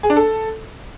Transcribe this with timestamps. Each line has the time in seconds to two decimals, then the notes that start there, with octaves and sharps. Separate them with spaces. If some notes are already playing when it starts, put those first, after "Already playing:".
0.03 G#4
0.10 D4
0.16 A4